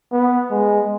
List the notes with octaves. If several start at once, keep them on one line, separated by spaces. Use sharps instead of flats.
B3
G#3